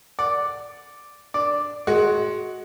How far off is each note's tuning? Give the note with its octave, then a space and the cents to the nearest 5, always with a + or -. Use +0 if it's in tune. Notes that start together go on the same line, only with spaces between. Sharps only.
D5 +0 F#5 +0
D4 +0 D5 +0
G#3 +20 F#4 +0